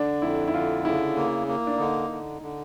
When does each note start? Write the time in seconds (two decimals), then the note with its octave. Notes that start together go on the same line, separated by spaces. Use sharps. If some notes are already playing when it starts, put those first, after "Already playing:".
Already playing: D3 D4
0.22 F2 E4
0.48 E4
0.54 D3 F4
0.85 C#3 E4
1.17 A#3
1.48 A#3
1.67 D4
1.78 D3 D#4
2.10 D3
2.42 D3